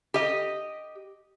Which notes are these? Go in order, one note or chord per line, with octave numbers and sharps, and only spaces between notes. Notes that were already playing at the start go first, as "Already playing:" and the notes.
G4 D#5